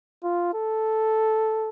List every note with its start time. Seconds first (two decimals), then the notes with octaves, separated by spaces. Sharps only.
0.24 F4
0.54 A4